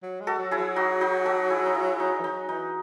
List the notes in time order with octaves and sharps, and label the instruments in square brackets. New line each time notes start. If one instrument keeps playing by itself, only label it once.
[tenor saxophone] F#3
G#3
[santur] F#4 A4
[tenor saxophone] F#3
[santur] E4 G#4
[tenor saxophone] F#3
[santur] D#4 F#4
D#4 F#4
F#4 A4
E4 G#4
D#4
E4
D#4
[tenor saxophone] E3
[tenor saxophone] F#3 [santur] D#4
[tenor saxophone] E3 [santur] D#4